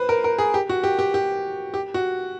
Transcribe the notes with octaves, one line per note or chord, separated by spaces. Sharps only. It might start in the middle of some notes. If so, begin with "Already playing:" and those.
Already playing: B4 C5
A#4
A#4
G#4
G4
F#4
G4
G4
G4
G4
F#4